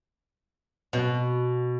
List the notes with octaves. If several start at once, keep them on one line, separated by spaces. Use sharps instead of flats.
B2